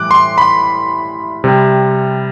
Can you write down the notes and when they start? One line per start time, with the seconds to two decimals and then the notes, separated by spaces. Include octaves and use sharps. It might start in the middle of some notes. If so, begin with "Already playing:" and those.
Already playing: A2 E3 G3 D6 F#6
0.11 C6
0.38 B5
1.44 C3 G3